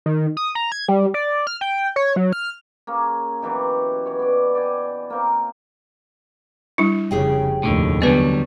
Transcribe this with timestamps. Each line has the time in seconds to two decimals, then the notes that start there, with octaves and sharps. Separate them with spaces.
0.06 D#3
0.37 D#6
0.55 A#5
0.72 G#6
0.88 G3
1.14 D5
1.47 F6
1.61 G5
1.96 C#5
2.16 F#3
2.33 F6
2.87 A#3 C#4 G#4
3.42 B2 E3 F#3 G4
4.06 E3 C#5
4.19 B3 D5
4.55 D5 G5 G#5
5.10 A#3 C4 A#4
6.78 G3 D4 E4
7.11 F1 C#3 G4 G#4 G5
7.63 F1 D#2 A2 D3
8.02 D3 F#3 G3 B3 B4